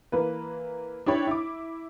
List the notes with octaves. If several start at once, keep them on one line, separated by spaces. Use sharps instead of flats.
E3 A#3 B4
D4 E4 G4 C#5 B5
E4 D6